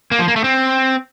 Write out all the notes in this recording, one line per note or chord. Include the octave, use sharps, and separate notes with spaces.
A#3
F3
A#3
A3
C4